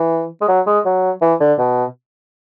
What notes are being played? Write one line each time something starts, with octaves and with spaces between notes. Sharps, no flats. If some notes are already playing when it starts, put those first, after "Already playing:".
Already playing: E3
G#3
F#3
G#3
F#3
E3
D3
B2